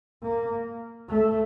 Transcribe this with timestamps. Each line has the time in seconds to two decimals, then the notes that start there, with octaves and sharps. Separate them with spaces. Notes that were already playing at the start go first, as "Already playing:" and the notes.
0.23 A#3
1.09 A3